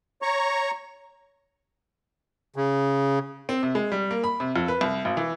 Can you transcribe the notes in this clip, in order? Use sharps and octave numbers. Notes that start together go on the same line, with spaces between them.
C#5 A#5 C#6
C#3
C4
C3
G#3
G3
A#3
B5
C3
F2
B4
C2
G#1
E3